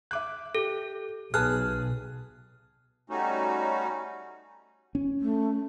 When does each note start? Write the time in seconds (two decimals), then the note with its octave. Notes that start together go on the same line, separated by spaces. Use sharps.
0.11 E5 D6 F#6
0.55 G4 A4
1.34 B1 G#4 B4 A5 F6 F#6
3.10 G3 A3 C#4 D#4 F#4
4.95 C#4
5.21 A3